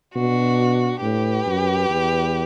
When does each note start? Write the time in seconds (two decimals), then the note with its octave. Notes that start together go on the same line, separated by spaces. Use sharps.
0.15 B2 D4 F#4
1.02 A2 G4 B4
1.46 F#2
1.90 E2